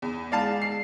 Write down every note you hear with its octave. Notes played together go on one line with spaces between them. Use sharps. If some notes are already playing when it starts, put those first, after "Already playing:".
E2
G#3 D5 F5 A5
C7